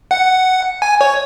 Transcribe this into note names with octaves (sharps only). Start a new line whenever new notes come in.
F#5
G#5
C#5